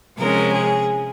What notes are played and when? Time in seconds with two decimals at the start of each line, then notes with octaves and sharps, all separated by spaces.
0.17 C3 F3 G#3 C#4 A#4
0.51 G#4